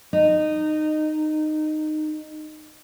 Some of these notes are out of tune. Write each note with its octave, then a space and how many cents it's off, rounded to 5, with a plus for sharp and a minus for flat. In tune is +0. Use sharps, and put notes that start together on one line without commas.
D#4 -15